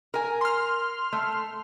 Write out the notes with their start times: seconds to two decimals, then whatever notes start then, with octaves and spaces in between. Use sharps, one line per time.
0.14 A#4 G#5
0.41 C6 F6
1.13 A3